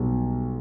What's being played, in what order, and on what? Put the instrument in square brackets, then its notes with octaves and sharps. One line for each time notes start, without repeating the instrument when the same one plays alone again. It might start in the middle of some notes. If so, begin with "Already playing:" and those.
Already playing: [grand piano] B1 B2 G3 B3